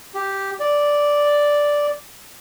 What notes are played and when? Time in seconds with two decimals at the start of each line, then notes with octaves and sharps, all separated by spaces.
0.14 G4
0.60 D5